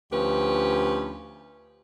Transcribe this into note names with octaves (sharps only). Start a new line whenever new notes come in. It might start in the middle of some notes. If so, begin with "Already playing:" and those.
D2 F3 C#4 G4 B4